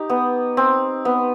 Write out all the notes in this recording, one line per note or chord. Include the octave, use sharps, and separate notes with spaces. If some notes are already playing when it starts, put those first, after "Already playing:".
Already playing: D#4 G4
B3
C4
B3